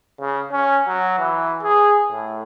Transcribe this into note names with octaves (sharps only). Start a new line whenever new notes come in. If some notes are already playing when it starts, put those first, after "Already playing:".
C#3
C#4
F#3
E3
G#4
A2